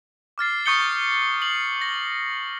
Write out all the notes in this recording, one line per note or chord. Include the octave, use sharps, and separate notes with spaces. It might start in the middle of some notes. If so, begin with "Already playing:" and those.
D6 F6 A6 C7
C#6 D#6 G6 C#7 G7
C7 F#7
A#6